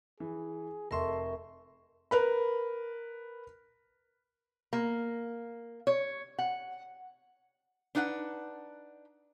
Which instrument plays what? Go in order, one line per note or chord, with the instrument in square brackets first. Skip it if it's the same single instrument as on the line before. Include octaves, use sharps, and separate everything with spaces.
[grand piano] E3 [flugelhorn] G#4
[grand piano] F1 C6 [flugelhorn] A4 [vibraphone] A#4 E5 C#6
[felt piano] A#4 B4 B5
[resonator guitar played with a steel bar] A#3
C#5
F#5
D4 D#4 B4 E5 F#5